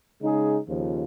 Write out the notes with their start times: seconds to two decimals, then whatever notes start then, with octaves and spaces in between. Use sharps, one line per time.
0.21 C#3 G#3 D#4 G#4
0.68 D#2 C#3 F3